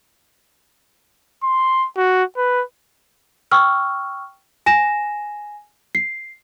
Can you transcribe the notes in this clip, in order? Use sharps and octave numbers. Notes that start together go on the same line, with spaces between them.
C6
F#4
B4
G5 C#6 E6 F6
G#5 A#6 E7
C7